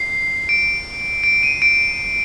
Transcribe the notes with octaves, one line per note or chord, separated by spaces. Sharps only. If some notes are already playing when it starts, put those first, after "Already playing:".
Already playing: C7
D7
D7
D#7
D7